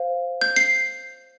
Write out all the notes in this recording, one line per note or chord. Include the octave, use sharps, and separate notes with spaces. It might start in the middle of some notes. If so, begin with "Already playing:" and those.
Already playing: C5 F5
G6
C7